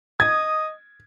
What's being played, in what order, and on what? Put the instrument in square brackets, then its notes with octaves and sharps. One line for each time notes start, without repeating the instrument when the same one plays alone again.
[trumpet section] D#5 D#6 [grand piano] G#6